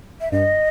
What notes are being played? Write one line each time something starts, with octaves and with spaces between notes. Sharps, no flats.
E5
G2 D#5